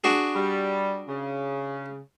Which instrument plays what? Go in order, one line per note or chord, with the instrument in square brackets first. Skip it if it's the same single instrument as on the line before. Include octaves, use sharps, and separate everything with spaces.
[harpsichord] D4 F#4 G#4
[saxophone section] G3
C#3